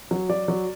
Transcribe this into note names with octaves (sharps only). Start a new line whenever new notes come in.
F#3
F#3 D5
F#3